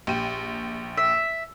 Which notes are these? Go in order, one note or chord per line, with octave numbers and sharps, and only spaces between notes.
A#1 G4 D#7
E5